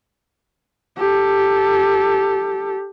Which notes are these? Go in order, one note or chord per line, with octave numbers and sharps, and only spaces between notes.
G4 A4